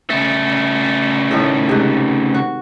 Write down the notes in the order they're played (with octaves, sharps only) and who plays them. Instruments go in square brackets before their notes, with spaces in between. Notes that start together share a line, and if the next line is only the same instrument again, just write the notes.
[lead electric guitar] C#3 A3
[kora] A2 D#3 A4
G#2 C3
F#4